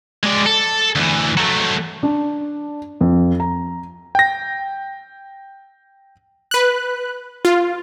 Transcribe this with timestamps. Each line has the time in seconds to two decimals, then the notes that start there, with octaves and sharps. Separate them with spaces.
0.23 G#3 D5
0.46 A4
0.95 D2 E3
1.37 F#3 A3
2.03 D4
3.01 F2
3.40 A#5
4.15 G5 A#6
6.51 B4 F#6
7.45 F4